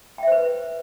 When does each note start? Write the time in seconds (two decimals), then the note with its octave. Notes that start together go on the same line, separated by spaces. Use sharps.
0.18 G5
0.23 E5
0.27 C5
0.32 B4